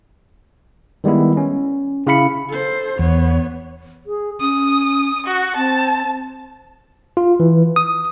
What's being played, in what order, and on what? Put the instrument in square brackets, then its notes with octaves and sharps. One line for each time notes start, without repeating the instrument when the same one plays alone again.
[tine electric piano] D#3 G3 G#3 B3 E4
C#4
C#3 E4 F5 B5 C#7
[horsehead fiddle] A4 C5
[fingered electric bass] E2 [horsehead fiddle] B3 C#5
[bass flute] G#4
[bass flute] C#4 [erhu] D#6
[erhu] F#4
[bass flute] C4 [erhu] A5
[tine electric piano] F4
E3
D#6